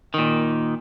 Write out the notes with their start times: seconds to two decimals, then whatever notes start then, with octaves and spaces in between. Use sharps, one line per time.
0.14 A#2 D#3